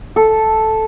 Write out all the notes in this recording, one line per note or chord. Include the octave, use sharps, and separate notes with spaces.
A4